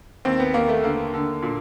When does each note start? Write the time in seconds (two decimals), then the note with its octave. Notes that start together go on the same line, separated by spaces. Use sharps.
0.25 D#2 C4
0.40 B3
0.54 D#2 A#3
0.69 A3
0.83 D3 A#3
1.14 D3
1.42 A#2